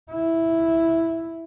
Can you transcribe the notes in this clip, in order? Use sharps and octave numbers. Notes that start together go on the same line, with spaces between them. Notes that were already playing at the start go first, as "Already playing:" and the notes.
E4